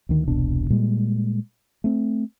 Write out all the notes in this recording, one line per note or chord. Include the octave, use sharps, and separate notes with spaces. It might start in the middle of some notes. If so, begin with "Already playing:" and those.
D2 D#3
E1 C2 B2 D4
A#2 G3 G#3
A3 C4